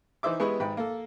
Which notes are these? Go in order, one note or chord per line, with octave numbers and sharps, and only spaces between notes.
E3 D#4 C5 E5 D6
G#3 B3 E4 G4 B4 C#6
G#1 G#2 B4 G5
A#3 A4